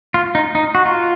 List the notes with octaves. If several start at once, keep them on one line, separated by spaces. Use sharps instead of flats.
F4
D#4
D#4
F#4
F4